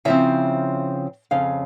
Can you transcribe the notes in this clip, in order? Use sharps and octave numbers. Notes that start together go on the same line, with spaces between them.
C#3 F3 C4 E4 E5
F2 C#3 F5